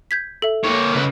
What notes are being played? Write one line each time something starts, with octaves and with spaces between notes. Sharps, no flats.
G6 G#6 B6
A4 E5
A#3 C#5
C#3 B4